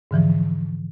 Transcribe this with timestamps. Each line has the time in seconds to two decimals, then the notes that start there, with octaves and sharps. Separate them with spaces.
0.11 G#2 D3 E3 F3